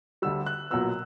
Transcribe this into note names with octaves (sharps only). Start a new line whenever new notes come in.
D2 D3 G3 E6
F#6
B1 A#2 F#3 B3 E6